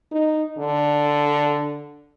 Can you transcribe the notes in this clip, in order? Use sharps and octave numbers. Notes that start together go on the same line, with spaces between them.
D#4
D3